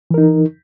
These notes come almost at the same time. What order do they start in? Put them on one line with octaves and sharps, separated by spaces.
E3 A#4 D#4